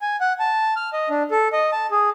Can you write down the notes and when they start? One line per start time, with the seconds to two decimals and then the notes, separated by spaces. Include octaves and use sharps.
0.02 G#5
0.21 F#5
0.40 A5
0.76 F6
0.93 D#5
1.10 D4
1.31 A4
1.53 D#5
1.72 A5
1.91 G#4